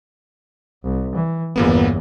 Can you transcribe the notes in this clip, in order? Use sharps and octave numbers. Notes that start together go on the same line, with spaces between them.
C2
E3
G1 E2 A#2 A#3 B3